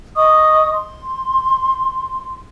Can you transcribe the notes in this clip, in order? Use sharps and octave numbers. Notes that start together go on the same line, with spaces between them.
D#5 C#6 D#6
C6